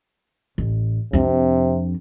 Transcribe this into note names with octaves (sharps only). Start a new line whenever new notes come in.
A1
F2 C3 D4